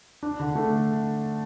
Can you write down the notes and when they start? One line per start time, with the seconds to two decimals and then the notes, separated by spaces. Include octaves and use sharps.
0.23 D4
0.40 D3
0.55 A3